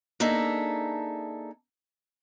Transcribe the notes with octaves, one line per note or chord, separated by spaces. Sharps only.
A#3 D4 D#4 G#4 A4 E5